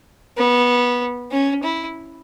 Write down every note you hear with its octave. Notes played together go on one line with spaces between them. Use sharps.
B3
C#4
E4